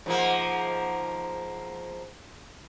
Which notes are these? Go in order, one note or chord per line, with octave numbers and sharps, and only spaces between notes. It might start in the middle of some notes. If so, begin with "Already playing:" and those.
G#2 F3 A#3